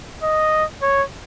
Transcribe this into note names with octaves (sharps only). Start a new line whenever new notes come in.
D#5
C#5